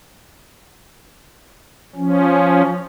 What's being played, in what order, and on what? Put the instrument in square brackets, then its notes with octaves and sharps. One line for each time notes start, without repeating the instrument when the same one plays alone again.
[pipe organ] F3 C#4